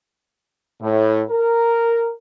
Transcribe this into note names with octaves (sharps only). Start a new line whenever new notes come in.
A2
A#4